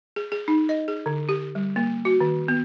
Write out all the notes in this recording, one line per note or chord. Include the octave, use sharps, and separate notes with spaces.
G#4
G#4
D#4
D#5
G#4
D3
G4
G3
A#3
F#4
D#3
B3